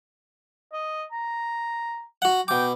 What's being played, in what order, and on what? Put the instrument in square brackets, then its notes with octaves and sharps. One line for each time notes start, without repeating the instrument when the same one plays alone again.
[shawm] D#5
A#5
[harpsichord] F#4 F#5
[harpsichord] B2 D6 [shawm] G5